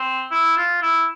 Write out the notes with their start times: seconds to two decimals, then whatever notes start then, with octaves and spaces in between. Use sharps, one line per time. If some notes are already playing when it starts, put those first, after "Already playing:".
Already playing: C4
0.31 E4
0.57 F4
0.82 E4